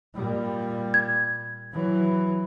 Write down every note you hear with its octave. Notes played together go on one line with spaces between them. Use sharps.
A#2 G3
G#6
E3 F#3